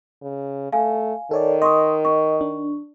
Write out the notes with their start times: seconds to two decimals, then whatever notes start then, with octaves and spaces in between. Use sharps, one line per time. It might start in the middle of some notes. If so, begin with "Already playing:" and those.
0.23 C#3
0.73 A3 F5 G#5
1.31 D#3 A4 C#5 D5
1.62 D#5 C6 C#6 D#6
2.05 C#6
2.41 D4